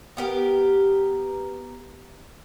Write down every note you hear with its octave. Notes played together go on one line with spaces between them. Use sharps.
B3 G4 A#4